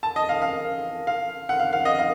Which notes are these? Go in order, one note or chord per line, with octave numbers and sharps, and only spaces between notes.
A5
D#5
F5
F5
F5
F#5
F5
F5
D#5
F5